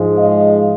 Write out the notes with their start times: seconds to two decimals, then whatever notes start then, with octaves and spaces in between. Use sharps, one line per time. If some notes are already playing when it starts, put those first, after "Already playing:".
Already playing: G#2 F3 G#3
0.18 D#5 F5